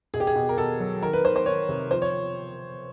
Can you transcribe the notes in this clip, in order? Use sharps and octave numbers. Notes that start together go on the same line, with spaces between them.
B2 G#4
G4
G#4
B2
A#4
B2 A4
F#3
D#3 A#4
B4
D#3 C5
C5
D#3 C#5
C3
F3 C5
C#5